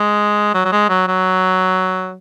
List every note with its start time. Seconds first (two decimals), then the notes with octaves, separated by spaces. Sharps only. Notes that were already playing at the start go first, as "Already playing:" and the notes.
Already playing: G#3
0.54 F#3
0.65 F#3
0.72 G#3
0.89 F#3
1.08 F#3